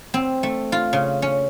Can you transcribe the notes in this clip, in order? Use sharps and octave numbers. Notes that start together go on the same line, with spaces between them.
C4
A3
F4
C#3
C#4